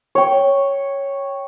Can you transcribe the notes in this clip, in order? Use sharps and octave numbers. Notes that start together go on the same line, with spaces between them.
C#5 G5